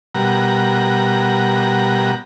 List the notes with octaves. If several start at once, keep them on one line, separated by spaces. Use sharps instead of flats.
B2 G3 A#4 F#5 A#5